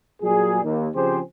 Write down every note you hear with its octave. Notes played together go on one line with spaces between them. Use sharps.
A#2 F#3 G3 A#3 G#4
D#2
C#3 F3 C4 G4 G#4 C5